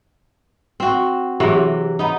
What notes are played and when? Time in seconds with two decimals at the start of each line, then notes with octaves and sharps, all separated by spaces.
0.80 C4 F#4
1.40 C3 E3 F#3 G4 G#4
1.99 B3 D#4